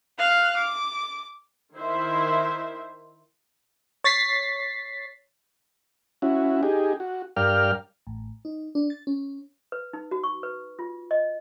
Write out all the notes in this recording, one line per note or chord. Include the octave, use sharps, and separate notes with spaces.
F5 F#6
D6
D#3 E4 C5 E5
C#5 A6 B6 C7
C#4 E4 F#4
D#4 G4 G#4
F#4
G2 A#4 D5 F5 G5 F6
A1
D#4
D4
A6
C#4
B4
D#4
F#4
C#6
B4
F4
D#5